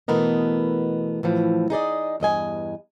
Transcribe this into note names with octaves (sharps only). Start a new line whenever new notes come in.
B2 E3 A3 B3 A#4 D#5
A2 E3 F3
D#4 G#4 D5 D#5
E2 G2 D#5 G#5